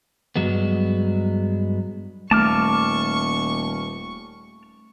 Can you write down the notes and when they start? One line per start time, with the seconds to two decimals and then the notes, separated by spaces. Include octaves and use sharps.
0.36 G2 F#3 G#3 B3
2.31 D#1 A3 A5 C#6 D6 F6